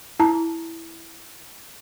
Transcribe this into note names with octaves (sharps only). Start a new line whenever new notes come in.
E4 A5 A#5